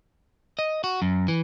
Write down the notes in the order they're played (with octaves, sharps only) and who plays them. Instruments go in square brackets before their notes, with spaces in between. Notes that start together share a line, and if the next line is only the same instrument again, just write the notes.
[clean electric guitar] D#5
F#4
F#2
E3